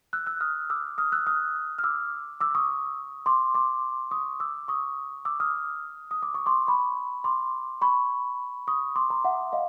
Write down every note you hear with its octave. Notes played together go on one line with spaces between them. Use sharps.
E6 F#6
E6 F#6
D#6 F6
D6 E6
D#6 F6
E6 F#6
D#6 F6
F6
D6 E6
D6 E6
C#6 D#6
C6 D6
C6 D6
C#6 D#6
D6 E6
C#6 D#6
D6 E6
D#6 F6
D#6
D6
C#6
C6 D6
B5 C#6
C6 D6
B5 C#6
C#6 D#6
C6 D6
A#5 C6
E5 F#5
D#5 F5